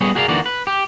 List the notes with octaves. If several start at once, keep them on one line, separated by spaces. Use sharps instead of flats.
G3 B3 G#4 C#5
F#4 G#4 A#4 D5 D#5 F5
D#2 D3 E3 A#3 F#4 D5
B4
G4